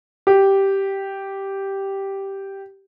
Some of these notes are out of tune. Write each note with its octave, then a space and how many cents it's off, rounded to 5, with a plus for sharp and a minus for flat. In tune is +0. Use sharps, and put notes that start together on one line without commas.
G4 -5